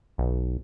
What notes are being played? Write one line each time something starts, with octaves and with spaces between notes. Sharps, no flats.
B1